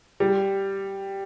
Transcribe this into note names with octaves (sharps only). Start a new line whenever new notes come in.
G3